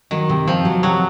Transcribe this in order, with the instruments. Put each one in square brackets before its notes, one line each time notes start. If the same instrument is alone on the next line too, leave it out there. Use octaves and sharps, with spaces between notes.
[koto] D#3 [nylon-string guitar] F#3
[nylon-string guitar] C3
[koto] F3 [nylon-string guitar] C4
[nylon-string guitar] F#3
[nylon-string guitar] C3 [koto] F#3